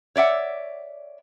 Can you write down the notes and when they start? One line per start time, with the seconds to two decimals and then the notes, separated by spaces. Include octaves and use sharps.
0.16 C#5 D5 E5 F#5